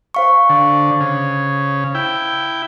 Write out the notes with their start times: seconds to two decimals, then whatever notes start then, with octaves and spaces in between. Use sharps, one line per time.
0.14 C5 F5 C#6
0.49 D3
1.00 C#3
1.95 E4 G5